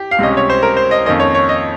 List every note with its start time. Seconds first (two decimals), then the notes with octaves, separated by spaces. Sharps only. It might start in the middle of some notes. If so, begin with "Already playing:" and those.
Already playing: G4
0.11 F5
0.19 C#2 C3 G3 C#4 D#5
0.37 C#5
0.50 C5
0.63 A#4
0.77 C5
0.91 D#5
1.06 F2 D#3 A#3 C#4 D#5
1.20 C#5
1.34 C#5
1.49 D#5